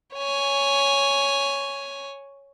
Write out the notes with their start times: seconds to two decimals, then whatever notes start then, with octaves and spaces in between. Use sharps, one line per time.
0.16 C#5 G#5